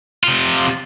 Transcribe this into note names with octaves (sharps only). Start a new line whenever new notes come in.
C3 F4